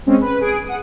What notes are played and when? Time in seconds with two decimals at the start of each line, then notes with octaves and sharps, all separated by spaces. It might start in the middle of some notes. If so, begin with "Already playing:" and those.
0.06 G#3 C4 C#4
0.21 B4
0.40 G#4 D7
0.65 F#5 D#6